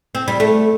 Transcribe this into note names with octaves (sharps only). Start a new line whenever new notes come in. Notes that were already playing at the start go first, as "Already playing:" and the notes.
C4
G3
A3